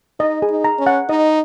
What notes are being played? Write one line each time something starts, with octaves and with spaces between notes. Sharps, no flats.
D#4 D#5
G#4
D#4
A#5
C#4
F#5
D#4 D#5